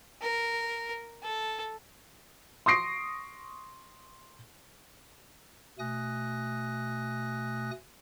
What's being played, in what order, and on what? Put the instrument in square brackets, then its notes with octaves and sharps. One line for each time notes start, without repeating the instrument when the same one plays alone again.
[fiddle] A#4
A4
[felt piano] C6 C#6 D#6 A#6 C7 D7
[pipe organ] B2 A3 G#5 D#6 F#6 A#6